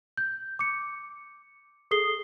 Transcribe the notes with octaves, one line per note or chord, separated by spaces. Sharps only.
G6
D6 C#7
G#4 A4 D#6 C7 G7